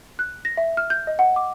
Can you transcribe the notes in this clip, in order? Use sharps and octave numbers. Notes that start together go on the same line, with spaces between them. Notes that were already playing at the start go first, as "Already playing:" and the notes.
F#6
A#6
E5
F6
G6
D#5
F#5
D6